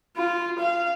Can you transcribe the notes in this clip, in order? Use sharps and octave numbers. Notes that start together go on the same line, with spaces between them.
F4
F5